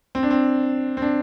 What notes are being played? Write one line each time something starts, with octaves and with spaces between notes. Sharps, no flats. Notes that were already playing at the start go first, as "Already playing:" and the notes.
C4
D4
C4
C4
D4